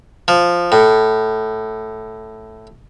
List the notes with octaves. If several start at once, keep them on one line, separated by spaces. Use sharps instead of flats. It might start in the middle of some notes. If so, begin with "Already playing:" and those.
F3
A2